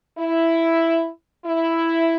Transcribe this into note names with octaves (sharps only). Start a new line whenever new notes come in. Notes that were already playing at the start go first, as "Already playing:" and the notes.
E4
E4